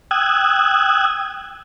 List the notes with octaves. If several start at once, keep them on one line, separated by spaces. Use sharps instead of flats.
G5 D#6 E6 F#6 G#6